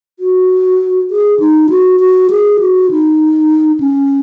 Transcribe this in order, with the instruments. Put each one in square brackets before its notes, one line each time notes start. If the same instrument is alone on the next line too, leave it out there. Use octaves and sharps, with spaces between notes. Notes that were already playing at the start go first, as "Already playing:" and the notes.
[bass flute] F#4
G#4
D#4
F#4
F#4
G#4
F#4
D#4
C#4